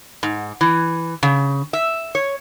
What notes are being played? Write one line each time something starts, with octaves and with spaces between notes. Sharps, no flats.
G#2
E3
C#3
E5
C#5